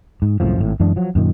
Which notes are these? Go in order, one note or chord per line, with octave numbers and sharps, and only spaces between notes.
G#2
C2 F#2 A2 F3
G#1 A2
F#2 E3 G#3 D4
F3 F#3
F#2 A#2 D#3